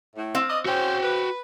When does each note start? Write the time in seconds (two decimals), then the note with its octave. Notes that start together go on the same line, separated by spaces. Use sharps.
0.16 A2
0.35 C4 F5
0.48 D5 D#5
0.66 C#4 F#4 C5 G5
1.02 B4